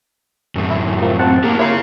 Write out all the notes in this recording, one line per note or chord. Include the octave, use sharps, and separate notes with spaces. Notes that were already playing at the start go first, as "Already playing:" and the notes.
F#2 A2
E4
F3 A3 A#3 C4
C4 F#5 A5
A#3 G4 A#4
A#3 E4 F4 A#4 C#5 F5